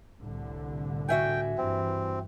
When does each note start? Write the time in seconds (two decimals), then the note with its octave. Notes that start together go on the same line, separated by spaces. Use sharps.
0.20 C2 A2 D3
1.09 F#4 E5 G5 G#5
1.58 G2 E3 C4